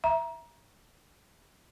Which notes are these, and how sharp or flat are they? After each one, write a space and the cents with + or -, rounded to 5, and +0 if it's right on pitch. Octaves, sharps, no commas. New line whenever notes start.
E5 +0 A#5 +20